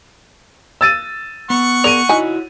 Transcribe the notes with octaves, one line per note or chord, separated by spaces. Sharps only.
E6 A6 D#7
B3 F#5 C#6
G#4 A#4 D5 D#7 F7
D#4 E4 F#4 C#5 G#5